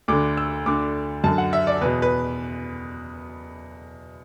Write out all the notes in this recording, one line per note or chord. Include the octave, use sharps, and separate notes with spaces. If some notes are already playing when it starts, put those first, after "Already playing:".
D2 D3 D6
E6
D2 D3 D6
F#2 D3 A5
F#5
E5
D5
E2 B2 B4
B4